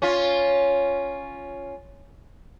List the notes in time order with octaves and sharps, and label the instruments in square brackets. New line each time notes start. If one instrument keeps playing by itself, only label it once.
[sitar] C#4 F4